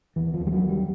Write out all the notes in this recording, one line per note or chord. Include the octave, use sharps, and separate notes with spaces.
D#2 E3
F3
D#2
G3
F#3
D#2
G3